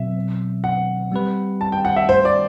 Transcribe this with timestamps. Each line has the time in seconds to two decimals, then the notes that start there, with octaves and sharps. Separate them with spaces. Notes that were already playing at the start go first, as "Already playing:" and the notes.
Already playing: B2 F#3 C4 E5
0.64 F#5
1.12 G3 C4 G4 B4
1.61 A5
1.72 G5
1.85 F#5
1.96 E5
2.09 C5
2.25 D5